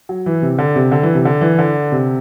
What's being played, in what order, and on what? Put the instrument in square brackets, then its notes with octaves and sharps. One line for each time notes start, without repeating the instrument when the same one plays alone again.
[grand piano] F#3
E3
C3
D3
C3
D3
E3
C3
D3
E3
D3
C3